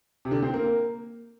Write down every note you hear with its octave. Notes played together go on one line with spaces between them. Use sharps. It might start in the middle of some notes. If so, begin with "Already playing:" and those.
C3
D3
C4
A#3